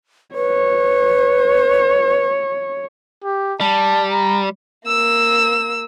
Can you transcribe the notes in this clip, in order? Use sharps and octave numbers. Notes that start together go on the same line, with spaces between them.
B4 C#5
G4
G3 A5
A#5
A#3 E6